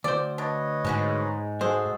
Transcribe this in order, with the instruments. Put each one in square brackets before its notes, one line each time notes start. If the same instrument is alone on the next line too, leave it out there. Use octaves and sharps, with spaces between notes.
[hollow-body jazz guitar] D2 C5 [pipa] D5
[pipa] D4 [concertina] B4 C#5 D#5
[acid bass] G#2 [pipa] G#3 C#4 F#4
[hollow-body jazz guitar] G#3 [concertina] F#4 G#4 A4 [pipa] C5